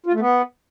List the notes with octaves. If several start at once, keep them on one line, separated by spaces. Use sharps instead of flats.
F4
A3
B3